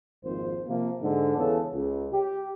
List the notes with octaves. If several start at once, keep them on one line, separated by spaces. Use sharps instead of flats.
G#1 F2 A#3 C5
C3 F3 A#3
G#2 D3
E2 C#3 B3 A4
C#2
G4